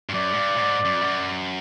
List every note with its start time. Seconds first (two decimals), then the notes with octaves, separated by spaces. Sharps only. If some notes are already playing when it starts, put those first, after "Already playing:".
0.09 G2
0.14 F#2 D5
0.33 G#2
0.38 G2
0.55 A2
0.61 G#2
0.85 F#2
0.93 F2
1.01 F#2